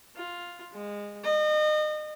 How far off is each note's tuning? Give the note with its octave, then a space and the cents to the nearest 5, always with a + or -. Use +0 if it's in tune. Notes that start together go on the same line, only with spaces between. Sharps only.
F4 +5
G#3 -20
D#5 -35